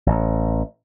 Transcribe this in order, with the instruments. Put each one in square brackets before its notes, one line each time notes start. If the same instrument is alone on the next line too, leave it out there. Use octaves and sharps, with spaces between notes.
[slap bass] A1